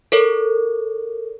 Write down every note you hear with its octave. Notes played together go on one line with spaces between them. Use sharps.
A4 A#4 C#5